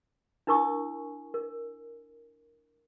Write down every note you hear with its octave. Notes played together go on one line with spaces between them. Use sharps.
D4 E4 A#4 G#5 C#6 D#6
A#4